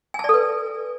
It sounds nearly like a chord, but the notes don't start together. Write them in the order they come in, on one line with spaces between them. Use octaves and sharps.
G#5 A5 D5 A4 B4